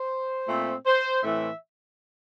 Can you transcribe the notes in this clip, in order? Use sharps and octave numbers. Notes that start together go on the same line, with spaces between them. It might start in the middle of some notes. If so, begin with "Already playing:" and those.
Already playing: C5
A#2 A3 C4
C5
A2 E3 A3 C4 E5